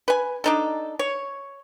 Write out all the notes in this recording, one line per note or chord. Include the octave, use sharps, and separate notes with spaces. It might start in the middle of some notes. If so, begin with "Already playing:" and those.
B4 G#5
D4 D#4 A4
C#5